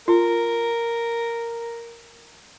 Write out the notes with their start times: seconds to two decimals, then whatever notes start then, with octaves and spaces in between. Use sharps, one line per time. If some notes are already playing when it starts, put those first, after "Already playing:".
0.08 F4 A#4